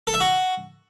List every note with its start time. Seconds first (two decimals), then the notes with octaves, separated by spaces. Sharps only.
0.07 A4
0.14 E5
0.20 F#4